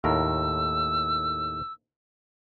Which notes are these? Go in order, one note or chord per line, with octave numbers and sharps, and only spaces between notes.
D#2 A2 A#4 E6